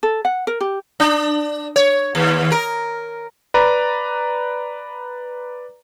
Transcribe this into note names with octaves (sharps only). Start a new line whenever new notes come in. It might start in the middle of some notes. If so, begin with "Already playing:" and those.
A4
F#5
A#4
G4
D4
C#5
D#2
A#4
B4 D5 A#5